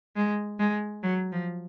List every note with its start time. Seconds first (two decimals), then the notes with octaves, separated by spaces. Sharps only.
0.16 G#3
0.59 G#3
1.03 F#3
1.32 F3